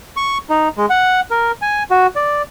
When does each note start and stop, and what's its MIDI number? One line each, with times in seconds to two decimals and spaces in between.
0.17 0.38 85
0.50 0.68 63
0.77 0.86 56
0.90 1.20 78
1.31 1.52 70
1.62 1.83 80
1.91 2.07 66
2.16 2.42 74